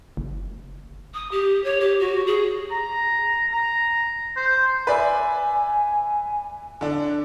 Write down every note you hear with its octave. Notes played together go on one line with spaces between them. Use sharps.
F#1
D#6
G4
C#5
G4
F#4
G#4
A#5
A#5
C5
B4 D5 E5 G#5
D3 D4